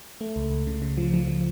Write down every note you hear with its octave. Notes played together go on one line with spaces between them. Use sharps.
A3
C#2
C#2
C#3
C#3
F3
F3
F3